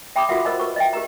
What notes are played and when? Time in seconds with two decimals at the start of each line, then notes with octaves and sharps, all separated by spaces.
0.16 E5 G5 B5 C6 D6 D#6
0.29 F4 F#4 A4 A#4 E5 F#5
0.45 A#4 C5 D#5 A5 B5
0.60 A#4 B4 A5 C#6
0.76 D#5 E5 G5
0.93 G4 A#4 A#5